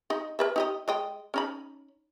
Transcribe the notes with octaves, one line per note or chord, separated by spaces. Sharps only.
D#4 D#5
A#4 B4 E5
D#4 G4 D#5
G#3 D#5 G5
C#4 D#4 B5